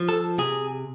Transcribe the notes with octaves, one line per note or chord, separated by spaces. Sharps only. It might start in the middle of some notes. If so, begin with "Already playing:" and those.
Already playing: F3
A4
C3 G#4